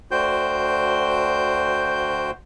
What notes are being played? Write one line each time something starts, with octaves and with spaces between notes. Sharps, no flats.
D2 D3 F#4 C5 G5 G6